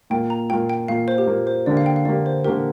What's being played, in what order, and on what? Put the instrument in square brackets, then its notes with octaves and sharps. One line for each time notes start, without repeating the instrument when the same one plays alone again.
[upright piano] A#2 A#3 F4 [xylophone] G5
[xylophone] A#5
[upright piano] A#2 A#3 F4 [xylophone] G5
[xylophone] G5
[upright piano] A#2 A#3 F4 [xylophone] F5
[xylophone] C5
G4
[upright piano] A#2 A#3 F4
[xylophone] C5
[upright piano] D3 A#3 G4 [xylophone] D5
[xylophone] F5
G5
F5
[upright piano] D3 A#3 G4 [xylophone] D5
[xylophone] C5
[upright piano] D3 A#3 G4 [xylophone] A#4